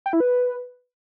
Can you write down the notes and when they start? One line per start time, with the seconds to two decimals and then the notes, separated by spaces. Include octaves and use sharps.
0.06 G5
0.13 E4
0.20 B4